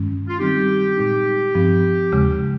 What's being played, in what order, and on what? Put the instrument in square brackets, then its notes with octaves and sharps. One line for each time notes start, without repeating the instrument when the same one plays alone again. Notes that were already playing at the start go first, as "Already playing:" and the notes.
Already playing: [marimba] G2 D#3 G#3 C#4
[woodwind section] F4
[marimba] D#3 G3 C4 D#4 [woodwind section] G4
[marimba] A#2 G#3 D#4
G2 F3 C4
D#2 C#3 G#3